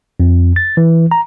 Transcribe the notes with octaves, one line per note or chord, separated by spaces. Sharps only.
F2
A6
E3
A#5